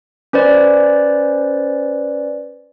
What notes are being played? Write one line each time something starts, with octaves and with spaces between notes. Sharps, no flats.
C#4 B4 C5 D5